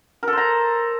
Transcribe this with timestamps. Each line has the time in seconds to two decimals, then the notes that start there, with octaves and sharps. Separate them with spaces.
0.23 A#4
0.28 A4
0.33 C5
0.38 A#5